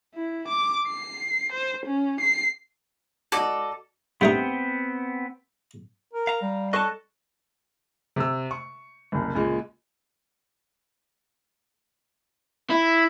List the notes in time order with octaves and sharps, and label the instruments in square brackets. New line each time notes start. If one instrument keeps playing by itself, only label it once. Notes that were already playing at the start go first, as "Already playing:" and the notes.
[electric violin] E4
D6
C7
C5
C#4
C7
[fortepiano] F#4 D#5 [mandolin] A4 D5
[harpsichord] G2 A3 D#4 [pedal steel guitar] B3 C4 G5
[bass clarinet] A#4
[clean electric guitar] F5 A#5
[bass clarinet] G3
[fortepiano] A4 C#6 F#6 [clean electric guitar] D#5 A5
[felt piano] C3 E6
C#6
F#1 C2
C#2 A#2 G#3
[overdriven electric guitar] E4